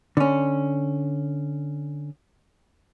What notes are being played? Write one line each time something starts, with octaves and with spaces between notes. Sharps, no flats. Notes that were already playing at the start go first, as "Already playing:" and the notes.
D3 C#4